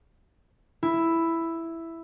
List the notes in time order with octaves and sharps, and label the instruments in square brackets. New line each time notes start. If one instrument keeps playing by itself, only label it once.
[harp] E4